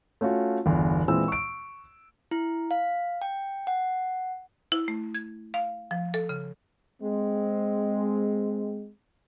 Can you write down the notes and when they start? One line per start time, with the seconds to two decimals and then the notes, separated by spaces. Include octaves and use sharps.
0.21 A3 C#4 F4 F#4
0.66 G1 E2
1.08 A#2 E3 G#3 C4 E6
1.28 C#6 D7
2.31 E4
2.71 F5
3.22 G5
3.67 F#5
4.72 E4
4.88 A3
5.15 G#6
5.54 F5
5.91 F3
6.14 A4
6.29 C#3
7.02 G#3 C4